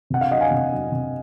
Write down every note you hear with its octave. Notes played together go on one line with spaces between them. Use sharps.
C3 F#5
F5
F#3 D#5 F#5
F5 G#5
C3
F#3
C3